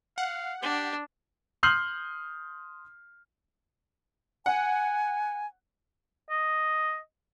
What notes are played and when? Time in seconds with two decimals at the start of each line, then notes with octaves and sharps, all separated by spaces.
0.18 F5 F#5
0.62 D4 G4
1.63 C6 D#6 F6 G6 C7 F#7
4.46 F#5 G#5
6.30 D#5